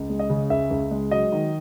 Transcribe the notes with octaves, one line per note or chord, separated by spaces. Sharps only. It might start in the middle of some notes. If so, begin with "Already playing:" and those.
Already playing: C#2
G#3
D#5
C#3
C#2 E5
C#2
G#3
F#3 D#5
D#3